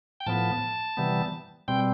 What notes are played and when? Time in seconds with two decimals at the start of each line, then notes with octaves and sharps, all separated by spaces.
0.20 G5
0.26 A2 F3 B3 A5
0.97 C3 E3 G3 B3
1.68 B2 G3 C4 G5